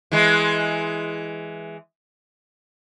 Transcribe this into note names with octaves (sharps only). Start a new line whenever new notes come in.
E3 G#3